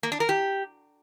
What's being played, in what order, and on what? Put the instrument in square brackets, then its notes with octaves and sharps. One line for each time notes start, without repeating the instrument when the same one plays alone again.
[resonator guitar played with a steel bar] A#3
D4
A#4
G4